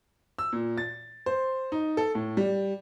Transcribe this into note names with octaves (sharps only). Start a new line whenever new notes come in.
E6
A#2
A6
C5
D#4
A4
A2
G3